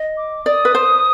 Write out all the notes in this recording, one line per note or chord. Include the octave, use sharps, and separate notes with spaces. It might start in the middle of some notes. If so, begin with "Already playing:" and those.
Already playing: D#5
D6
D5 D#6
B4
C5